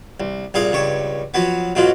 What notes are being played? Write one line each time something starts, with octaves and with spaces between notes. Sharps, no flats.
C2
C2 A#2 G#4 F5
C#2 G2 C#5
F3 F#3 B3
B1 G#2 B2 F#3 F4